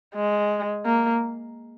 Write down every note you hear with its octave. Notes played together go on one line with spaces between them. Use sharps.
G#3
A#3